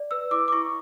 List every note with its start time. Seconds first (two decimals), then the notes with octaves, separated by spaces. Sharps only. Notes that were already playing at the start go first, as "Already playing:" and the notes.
Already playing: D5
0.11 B4 E6
0.31 E4 D6
0.48 D6
0.52 E4 C#6